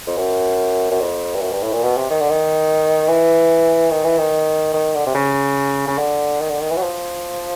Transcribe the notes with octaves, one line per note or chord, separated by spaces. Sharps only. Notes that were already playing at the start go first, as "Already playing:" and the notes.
F2
F#2
F#2
F2
G2
F#2
G2
A2
A#2
B2
C3
D#3
D3
D#3
E3
D#3
E3
D#3
D#3
D3
C3
C#3
C#3
D3
D#3
D3
D#3
E3
F#3
F3